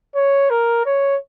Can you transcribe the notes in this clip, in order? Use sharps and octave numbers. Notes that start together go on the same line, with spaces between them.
C#5
A#4
C#5